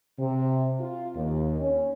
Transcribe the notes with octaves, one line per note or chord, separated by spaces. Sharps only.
C3
F4
D#2
C#4